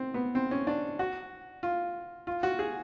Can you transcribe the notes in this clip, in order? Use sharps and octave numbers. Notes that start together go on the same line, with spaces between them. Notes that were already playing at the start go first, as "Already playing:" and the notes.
Already playing: C4
B3
C4
C#4
D4
F#4
F4
F4
F#4
G#4